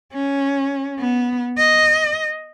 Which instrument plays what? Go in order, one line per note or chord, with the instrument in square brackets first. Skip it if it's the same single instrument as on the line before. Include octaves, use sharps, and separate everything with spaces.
[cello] C#4
B3
D#5